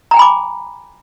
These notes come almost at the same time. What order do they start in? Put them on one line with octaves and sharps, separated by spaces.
A#5 G5 G#5 B5 D6